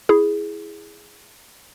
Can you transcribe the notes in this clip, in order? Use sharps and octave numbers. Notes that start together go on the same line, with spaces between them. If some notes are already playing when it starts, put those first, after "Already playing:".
E4 G#4